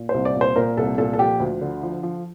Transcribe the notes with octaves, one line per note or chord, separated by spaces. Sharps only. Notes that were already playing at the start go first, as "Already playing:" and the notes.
Already playing: A#2
C5
C2
D5
A#2
C5
A#2 A#4
C2 A4
A#2 A4
A4
F3 G4
D2
D3
F3
F3